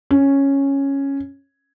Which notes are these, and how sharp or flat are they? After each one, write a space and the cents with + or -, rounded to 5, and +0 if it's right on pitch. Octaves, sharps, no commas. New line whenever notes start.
C#4 -5